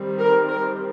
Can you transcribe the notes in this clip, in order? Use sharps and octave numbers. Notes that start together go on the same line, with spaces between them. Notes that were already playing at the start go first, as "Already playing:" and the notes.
Already playing: D#3 G3 C4
A#4
A#4